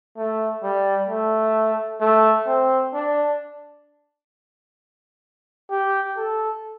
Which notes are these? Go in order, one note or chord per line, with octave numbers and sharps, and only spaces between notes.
A3
G3
A3
A3
C4
D4
G4
A4